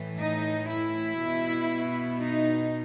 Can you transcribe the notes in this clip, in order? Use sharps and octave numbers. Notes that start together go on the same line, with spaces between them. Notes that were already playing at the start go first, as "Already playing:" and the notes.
Already playing: A2 E3
D#4
E4
B2
D#4